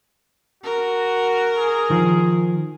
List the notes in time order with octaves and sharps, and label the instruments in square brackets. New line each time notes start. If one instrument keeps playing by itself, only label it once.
[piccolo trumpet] F#4 [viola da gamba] A#4
[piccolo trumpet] G#4
[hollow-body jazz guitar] D#3 F3